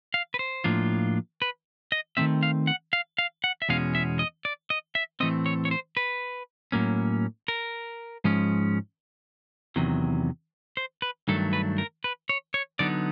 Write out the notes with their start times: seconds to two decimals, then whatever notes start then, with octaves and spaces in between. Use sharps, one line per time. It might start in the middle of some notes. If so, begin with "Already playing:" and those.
0.14 F5
0.34 B4
0.39 C5
0.64 A2 F3 A#3 D4 F4
1.42 B4
1.92 D#5
2.17 D#3 F#3 A3 C4 E5
2.43 F5
2.67 F#5
2.93 F5
3.18 F5
3.44 F#5
3.62 E5
3.69 E2 B2 G#3 C#4 F5
3.95 E5
4.19 D#5
4.45 D5
4.70 D#5
4.95 E5
5.20 A2 E3 A3 C4 D#5
5.46 C#5
5.65 C#5
5.71 C5
5.97 B4
6.72 A2 F#3 A#3 C#4
7.48 A#4
8.24 G#2 F3 G#3 C#4
9.76 E2 C3 D#3 F#3
10.77 C5
11.02 B4
11.28 G2 D#3 F#3 A3 D4 A4
11.53 B4
11.78 A#4
12.04 B4
12.29 C#5
12.54 C#5
12.79 D3 F#3 B3 D#4 D5